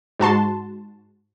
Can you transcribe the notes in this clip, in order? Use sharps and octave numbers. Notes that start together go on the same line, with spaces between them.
G#2 F#4 A5 C6